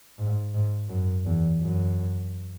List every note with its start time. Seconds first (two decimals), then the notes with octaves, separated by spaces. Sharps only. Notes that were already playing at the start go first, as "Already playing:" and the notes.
0.18 G#2
0.54 G#2
0.89 F#2
1.26 E2
1.61 F#2